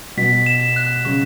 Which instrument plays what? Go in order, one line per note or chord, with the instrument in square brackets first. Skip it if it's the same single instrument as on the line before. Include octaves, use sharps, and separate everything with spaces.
[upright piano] B2 [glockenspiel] B6
[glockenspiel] E7
F#6
[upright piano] C#3 [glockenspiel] C#6